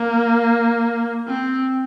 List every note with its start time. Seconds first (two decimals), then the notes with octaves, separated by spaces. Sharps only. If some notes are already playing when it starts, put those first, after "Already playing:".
Already playing: A#3
1.28 C4